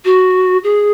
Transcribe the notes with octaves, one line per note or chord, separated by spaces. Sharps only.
F#4
G#4